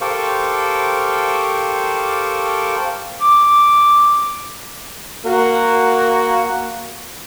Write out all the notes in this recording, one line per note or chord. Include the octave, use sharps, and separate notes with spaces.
G4 A4 A#4 C5 F5 C#6
D6
A#3 F#4